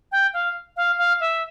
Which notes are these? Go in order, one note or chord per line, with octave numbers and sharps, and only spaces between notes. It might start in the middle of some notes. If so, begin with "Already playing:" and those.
G5
F5
F5
F5
E5